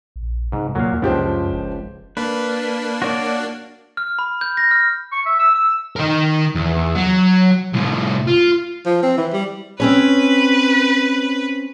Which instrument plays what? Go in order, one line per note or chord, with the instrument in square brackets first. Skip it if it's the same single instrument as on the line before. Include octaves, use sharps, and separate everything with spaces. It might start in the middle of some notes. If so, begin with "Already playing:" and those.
[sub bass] A#1
[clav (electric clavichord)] G#2 [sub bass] C3
[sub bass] D#2 [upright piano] A#2 [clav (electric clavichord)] F#3 F5
[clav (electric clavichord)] C#2 D4 [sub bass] F#2 [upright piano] F3 G4 C5
[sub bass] F#1
[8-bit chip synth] A#3 D4 [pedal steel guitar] B4
[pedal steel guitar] F#4 C#5 D5
[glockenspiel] F6
B5
G6
A#6
F6
[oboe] C#6
E5
E6
E6
[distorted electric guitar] D#3 A#4
E2
F#3
C2 A2
F4
[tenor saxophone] F3
C4
E3
G3
[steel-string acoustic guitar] C4 C#4 C#5 [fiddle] B4